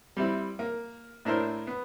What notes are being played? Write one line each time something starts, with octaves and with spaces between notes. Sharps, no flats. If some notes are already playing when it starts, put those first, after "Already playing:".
G3 C4 E4
A#3
A2 D4 E4 A#4 C5
B3